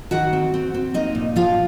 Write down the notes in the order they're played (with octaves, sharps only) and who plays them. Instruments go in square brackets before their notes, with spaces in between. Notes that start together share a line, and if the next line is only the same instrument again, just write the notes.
[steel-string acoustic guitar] D#3 F#4 F#5
C4
C4
C4
A#3 D#4 D#5
A#2
F3 F4 F5